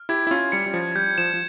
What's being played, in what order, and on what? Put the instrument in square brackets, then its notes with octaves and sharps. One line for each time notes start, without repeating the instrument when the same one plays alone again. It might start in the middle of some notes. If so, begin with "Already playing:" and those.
Already playing: [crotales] F6
[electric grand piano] E4 G4 [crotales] G#6
[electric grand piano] E4
[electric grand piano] C#4 F4 [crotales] G#6
[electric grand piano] G3 [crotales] C#7
[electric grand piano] G3
[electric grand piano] F3 [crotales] C#7
[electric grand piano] G3 [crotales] G6
[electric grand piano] F3 [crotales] E7
[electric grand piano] F3